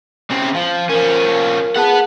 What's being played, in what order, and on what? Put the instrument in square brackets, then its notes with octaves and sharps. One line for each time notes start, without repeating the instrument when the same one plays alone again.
[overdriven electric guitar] C#3 C4
F3
[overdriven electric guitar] F3 C#4 [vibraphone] A#4
[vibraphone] G#4 A5 [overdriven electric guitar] B4 F#5